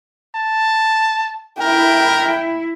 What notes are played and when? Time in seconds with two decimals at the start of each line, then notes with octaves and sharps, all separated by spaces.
0.35 A5
1.61 E4 A#4 G5